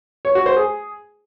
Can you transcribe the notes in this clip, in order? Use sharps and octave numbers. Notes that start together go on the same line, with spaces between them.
C#5
F#4
C5
G#4